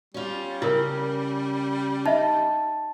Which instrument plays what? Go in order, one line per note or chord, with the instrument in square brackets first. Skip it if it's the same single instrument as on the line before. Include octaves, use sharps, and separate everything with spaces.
[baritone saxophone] G3 [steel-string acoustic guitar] C#4 F4
[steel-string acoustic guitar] C#3 [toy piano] E4 A#4
[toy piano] D#4 D#5 E5 [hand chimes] A5